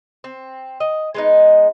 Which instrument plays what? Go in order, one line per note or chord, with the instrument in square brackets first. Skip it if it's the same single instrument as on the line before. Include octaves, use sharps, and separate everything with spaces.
[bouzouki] C4
D#5
G#3 B3 D#4